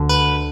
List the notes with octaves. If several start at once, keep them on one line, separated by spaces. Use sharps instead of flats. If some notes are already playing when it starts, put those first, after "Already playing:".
Already playing: D2 D3
B4